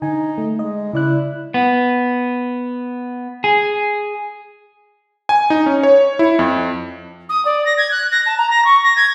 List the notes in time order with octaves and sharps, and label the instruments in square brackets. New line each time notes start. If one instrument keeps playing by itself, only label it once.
[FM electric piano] D3 G#5 [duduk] D#4
[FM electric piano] A3
[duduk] G#3 [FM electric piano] D#5
[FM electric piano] C#3 D5 F#6 [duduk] E4
[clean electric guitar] B3
G#4
[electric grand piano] G#5
D#4
C#4
C#5
E4
F2
[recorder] D#6
D5
A#6
G#6
F#6
A#6
A5
A#5
A#6
C#6
A#6
G#6